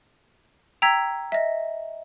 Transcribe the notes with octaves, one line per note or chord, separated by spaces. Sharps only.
G5 A#5 E6 G#6 B6
D#5 E5